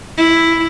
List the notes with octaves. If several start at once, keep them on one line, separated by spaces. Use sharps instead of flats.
E4